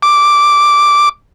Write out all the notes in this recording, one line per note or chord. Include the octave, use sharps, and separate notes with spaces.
D6